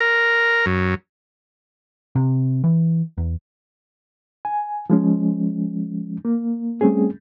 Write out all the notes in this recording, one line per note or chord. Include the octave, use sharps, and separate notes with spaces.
A#4
F#2
C3
E3
E2
G#5
F3 G#3 C#4
A#3
G3 A3 C4 C#4 G#4